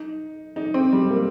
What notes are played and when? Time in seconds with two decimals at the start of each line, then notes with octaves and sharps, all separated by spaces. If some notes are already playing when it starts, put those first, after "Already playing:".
Already playing: D#4
0.56 D#4
0.74 C4
0.93 G3
1.10 A#3